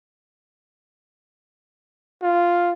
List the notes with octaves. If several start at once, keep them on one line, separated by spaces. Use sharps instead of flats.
F4